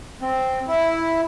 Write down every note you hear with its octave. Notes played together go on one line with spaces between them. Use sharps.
C4
E4